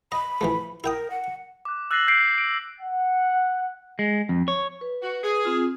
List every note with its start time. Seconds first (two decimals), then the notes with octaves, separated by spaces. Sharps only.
0.12 D#5 B5
0.41 E3 F3 A3
0.84 E4 A#4 G5 D#6
1.10 F#5
1.65 D6 F#6
1.91 E6 F#6 A6 A#6 C7 F#7
2.07 F#6 G6 B6 C7 D7
2.38 D7
2.81 F#5
3.99 G#3
4.29 F2
4.48 C#5
4.81 B4
5.02 F#4
5.23 G#4
5.45 C4 F4